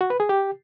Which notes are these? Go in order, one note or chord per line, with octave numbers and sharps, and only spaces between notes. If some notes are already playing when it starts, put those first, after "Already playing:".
F#4
B4
G#4
G4